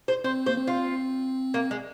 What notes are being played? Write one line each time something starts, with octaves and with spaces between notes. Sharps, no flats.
C5
C4 C5
A#3 C5
C4
F4
A#3
G#3